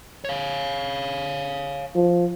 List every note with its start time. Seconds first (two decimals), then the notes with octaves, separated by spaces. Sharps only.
0.25 C#5 F5
1.95 F3